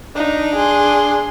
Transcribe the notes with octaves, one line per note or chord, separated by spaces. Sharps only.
D4 D#4
G#4 C6